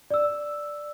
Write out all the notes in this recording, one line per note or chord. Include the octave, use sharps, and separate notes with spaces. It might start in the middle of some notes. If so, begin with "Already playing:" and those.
D5 E6